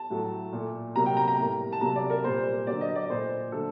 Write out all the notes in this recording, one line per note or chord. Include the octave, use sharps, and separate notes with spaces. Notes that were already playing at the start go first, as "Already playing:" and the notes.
Already playing: A5
A2 F#3 A3
A#2 A3
C3 F#3 A#3 A#5
G5
A#5
A#5
A2 G3 A#3
A5
C3 F#3 A#3 A#5
D5
A#4
A#2 G3 A#3 C5
D3 F#3 A#3 D5
D#5
D5
A#2 A3 C5
D3 F#3 A3 A4